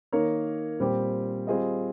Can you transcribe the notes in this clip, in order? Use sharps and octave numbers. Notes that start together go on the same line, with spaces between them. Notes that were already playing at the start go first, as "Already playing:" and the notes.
D#3 A#3 D#4 A#4 C#5
A#2 G3 C4 G4 C5
G3 C4 F4 G#4 D#5